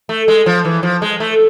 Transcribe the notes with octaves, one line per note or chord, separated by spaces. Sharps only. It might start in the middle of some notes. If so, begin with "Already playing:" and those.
A3
G#3
F3
E3
F3
G#3
A3